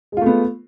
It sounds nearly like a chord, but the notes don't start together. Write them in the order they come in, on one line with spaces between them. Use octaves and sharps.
G#3 F4 A3 B3